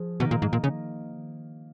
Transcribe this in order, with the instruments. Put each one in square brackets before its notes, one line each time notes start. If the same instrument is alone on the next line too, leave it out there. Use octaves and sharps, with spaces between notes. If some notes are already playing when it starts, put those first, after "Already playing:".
Already playing: [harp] F3 G#4
[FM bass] B2 [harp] D#3 A#3 D#4
[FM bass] A#2
G#2
A#2
C#3